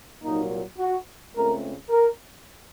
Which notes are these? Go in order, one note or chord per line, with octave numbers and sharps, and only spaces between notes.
C2 A#2 F#3 A#3 D#4
F#4
C#2 C#3 A3 C4 A#4
A#4